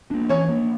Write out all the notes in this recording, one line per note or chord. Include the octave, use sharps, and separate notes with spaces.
A#3 D4
E3 C#4 C#5
A#3 D4